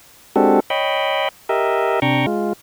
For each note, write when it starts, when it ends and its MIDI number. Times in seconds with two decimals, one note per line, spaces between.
0.36 0.60 56
0.36 0.60 60
0.36 0.60 62
0.36 0.60 66
0.36 0.60 67
0.36 0.60 69
0.70 1.28 73
0.70 1.28 75
0.70 1.28 79
0.70 1.28 83
1.49 2.00 67
1.49 2.00 70
1.49 2.00 75
1.49 2.00 76
2.02 2.26 48
2.02 2.26 62
2.02 2.26 79
2.02 2.26 82
2.02 2.26 85
2.26 2.53 56
2.26 2.53 65